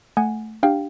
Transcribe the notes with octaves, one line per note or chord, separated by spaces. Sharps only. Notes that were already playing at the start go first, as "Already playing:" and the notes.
A3 F#5 G#5
D4 G4 F5 G5